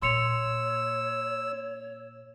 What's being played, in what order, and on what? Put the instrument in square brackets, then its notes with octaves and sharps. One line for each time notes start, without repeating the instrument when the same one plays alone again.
[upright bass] A#2 [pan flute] C#5 [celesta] C6 C#7 F7 [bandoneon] E6